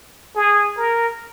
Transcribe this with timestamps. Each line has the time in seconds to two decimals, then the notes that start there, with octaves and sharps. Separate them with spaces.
0.35 G#4
0.77 A#4